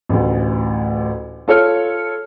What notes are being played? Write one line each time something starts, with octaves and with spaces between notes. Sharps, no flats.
A1 D2
F4 A4 C#5 F6